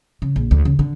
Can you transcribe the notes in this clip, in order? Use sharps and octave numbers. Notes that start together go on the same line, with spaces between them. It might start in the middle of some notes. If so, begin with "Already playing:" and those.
C#3
A#1
D2
C#3
D3